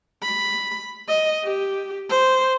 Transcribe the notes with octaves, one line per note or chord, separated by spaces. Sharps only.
B5
D#5
G4
C5